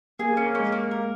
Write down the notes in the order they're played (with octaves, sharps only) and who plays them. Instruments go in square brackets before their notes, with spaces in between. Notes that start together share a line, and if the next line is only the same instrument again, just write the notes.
[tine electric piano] A#3 [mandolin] G#4
[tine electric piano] A#3 [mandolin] C#4
[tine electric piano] A#3
[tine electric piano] G#3 [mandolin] C#4
[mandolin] A#3
A#4